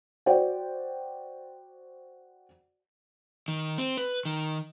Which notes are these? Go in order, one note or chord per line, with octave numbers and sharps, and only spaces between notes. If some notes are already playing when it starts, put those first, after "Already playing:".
F#4 C5 D5 F#5 G5
D#3
C4
B4
D#3